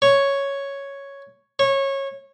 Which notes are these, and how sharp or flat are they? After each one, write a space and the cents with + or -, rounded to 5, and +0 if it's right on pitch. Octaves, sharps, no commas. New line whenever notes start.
C#5 +0
C#5 -20